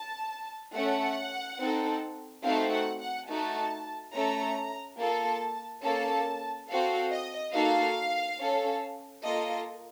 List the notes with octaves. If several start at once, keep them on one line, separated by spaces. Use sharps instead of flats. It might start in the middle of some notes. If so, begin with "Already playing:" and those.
Already playing: A5
A3 C#4 A4 F#5
C4 D#4 A4
A3 C4 D#4 F#4 A4 F5
F#5
F#5
A3 D#4 F#4 A5
A3 C#4 A4 A#5
A#3 F4 A4 A5
A#3 C#4 A4 A5
C4 F#4 A4 F5
D#5
A#3 D#4 F#4 A4 F5
C#4 A4
A#3 F4 A4 D#5